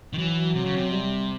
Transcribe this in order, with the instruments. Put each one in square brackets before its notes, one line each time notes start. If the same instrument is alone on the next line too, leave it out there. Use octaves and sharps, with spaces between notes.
[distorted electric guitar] D#3
[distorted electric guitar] E3 [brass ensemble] F#3
[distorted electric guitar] C3
C#3
C3
[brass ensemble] G3